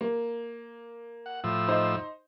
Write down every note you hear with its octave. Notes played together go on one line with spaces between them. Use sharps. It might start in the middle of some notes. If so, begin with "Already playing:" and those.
A#3
F#5
A2 F3 E6
D#4 C5